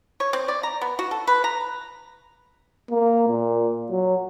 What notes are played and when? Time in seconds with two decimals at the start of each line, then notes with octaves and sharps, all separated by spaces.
0.20 C#5
0.33 C4
0.48 D5
0.63 A#5
0.81 B3
0.99 F#4
1.11 A4
1.27 B4
1.44 A#5
2.91 A#3
3.29 A#2
3.91 F#3